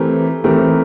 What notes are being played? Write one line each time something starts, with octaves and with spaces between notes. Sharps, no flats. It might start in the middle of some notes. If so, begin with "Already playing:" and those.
Already playing: E3 A3 C4 G4 A#4
E3 A3 C4 G4 A#4